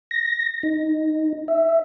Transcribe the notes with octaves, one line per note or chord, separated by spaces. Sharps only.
A#6
D#4
E5